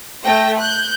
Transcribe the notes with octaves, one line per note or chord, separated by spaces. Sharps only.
A3 G5 A#6
F#6 G6